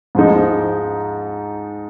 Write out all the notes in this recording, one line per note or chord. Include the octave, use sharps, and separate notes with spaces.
G#2 F3 G#3 D#4